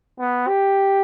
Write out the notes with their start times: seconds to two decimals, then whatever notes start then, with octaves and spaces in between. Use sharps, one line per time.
0.19 B3
0.48 G4